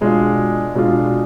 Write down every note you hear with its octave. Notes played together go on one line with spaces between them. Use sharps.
B2 G#3 D4 F4
B2 G#3 D4 F4